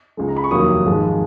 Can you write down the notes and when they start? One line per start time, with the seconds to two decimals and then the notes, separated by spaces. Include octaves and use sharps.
0.17 C#2 C#3 G#3
0.29 A#5
0.37 B5
0.44 C#6
0.51 F1 D#2 D#3 F#3 A#3 D#6
0.86 G#1 G#2 F3 G#3